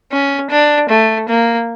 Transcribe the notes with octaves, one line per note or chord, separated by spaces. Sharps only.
C#4
D4
A3
A#3